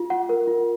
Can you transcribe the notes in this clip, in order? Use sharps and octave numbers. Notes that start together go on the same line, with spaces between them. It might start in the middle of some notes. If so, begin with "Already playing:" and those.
Already playing: F4
F#5
A#4
F4